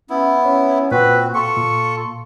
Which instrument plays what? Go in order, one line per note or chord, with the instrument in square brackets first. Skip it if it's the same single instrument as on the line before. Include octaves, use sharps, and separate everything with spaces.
[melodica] B3 E4 [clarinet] C#4
[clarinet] C#4 [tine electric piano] C#5
[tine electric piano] A#2 [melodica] C4 F#4 [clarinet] B4
[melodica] F4 A4 [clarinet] C#6
[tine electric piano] A#2